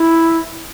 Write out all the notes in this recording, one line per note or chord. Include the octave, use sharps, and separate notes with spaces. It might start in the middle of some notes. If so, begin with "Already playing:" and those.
Already playing: E4